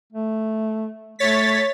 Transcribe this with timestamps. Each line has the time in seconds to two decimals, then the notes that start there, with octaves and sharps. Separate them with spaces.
0.13 A3
1.19 A3 C#5 A6 B6